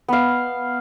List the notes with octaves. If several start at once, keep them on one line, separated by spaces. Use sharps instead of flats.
B3 F5